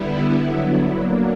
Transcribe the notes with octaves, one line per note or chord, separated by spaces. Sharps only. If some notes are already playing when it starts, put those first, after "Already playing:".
Already playing: D3 G3 B3 E4
D3 F#3 B3 E4
F#3 A#3 D4